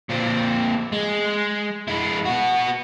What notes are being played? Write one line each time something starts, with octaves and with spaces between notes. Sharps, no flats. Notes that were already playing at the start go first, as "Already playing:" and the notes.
A#2 C4
G#3
G#3 E4
B3 F#4